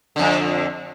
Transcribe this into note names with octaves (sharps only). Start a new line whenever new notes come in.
F2 D3